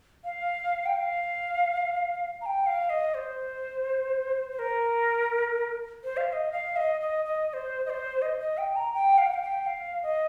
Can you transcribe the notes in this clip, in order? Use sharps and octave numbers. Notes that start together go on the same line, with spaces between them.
F5
G5
F5
A#5
G5
F5
D#5
C5
C5
A#4
C5
F5
F5
D#5
F5
D#5
D#5
D#5
D#5
C5
D#5
C5
D#5
D#5
G5
A#5
G5
F5
G5
F5
G5
F5
D#5